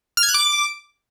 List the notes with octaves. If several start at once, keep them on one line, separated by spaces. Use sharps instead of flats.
F6
G#6
F#6
D6